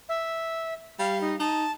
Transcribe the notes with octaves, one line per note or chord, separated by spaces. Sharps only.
E5
G3 F5
D#4
D#4 A5